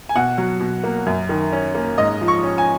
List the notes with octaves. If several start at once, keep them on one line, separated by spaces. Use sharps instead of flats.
G#5
B2 F#5
F#3
B2
A#3
F#2
D#3
C#4
A#3
G#2 D#5
F3
C#6
C#4
G#5